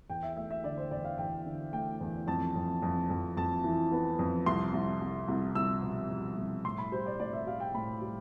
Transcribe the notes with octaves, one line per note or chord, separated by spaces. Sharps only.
E2 G5
E5
A3 E5
E5
D3 D5
C5
E2 D5
F5
E2 G5
D3
A3 G5
E2
F2 A5
F2
F2
F2
F2 A5
E3
B3
F2
C2 C6
C2
C2
C2
C2 E6
B2
B2
C2
A2 C6
B5
G3 C5
D5
A2 D5
E5
G3 F5
G5
A2 B5
G3